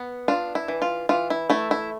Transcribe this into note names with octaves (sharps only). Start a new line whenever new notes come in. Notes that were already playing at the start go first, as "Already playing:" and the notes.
Already playing: B3
D4 F4
E4
E3
F4
E3 F4
E4
A3 E4
E4